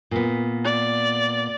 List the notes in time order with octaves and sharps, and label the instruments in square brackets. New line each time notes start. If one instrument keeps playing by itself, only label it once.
[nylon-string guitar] A#2 B3
[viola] D5